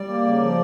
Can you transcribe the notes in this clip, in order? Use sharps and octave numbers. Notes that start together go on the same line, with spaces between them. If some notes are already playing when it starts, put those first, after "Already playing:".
Already playing: G3 D5
A#3
C#3
F3